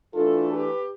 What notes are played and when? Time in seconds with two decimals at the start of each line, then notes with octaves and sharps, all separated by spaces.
0.14 E3 A3 D4 F4 A4
0.51 G4 B4